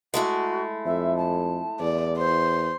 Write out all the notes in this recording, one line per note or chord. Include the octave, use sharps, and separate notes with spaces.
G#3 A3 E4 F#4
F2 E5
A5
E2 D5
C5 C6